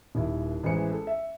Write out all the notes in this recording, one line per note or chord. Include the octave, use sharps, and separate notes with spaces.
D#1 D#2 E4
A1 E3 G#3 C5 C#7
A4
E5